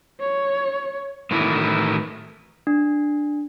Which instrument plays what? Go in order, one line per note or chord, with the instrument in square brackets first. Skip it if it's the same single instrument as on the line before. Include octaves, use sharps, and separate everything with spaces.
[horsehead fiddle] C#5
[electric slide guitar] A2 D#3 E3 A3 E4
[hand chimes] D4